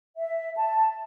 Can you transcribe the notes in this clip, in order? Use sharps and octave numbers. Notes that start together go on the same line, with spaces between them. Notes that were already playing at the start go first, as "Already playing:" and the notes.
E5
A5